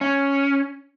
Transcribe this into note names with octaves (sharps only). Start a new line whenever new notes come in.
C#4